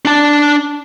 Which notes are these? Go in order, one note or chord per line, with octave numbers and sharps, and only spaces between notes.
D4 A5